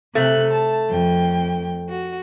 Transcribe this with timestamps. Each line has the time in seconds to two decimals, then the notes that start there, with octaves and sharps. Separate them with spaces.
0.15 C3 A3 F#6
0.52 A5
0.88 F2 G5
1.88 F#4